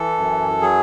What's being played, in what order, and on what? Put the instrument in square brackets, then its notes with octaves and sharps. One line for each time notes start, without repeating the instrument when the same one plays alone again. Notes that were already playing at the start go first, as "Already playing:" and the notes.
Already playing: [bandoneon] E3 A4
F#2
F#3 G#4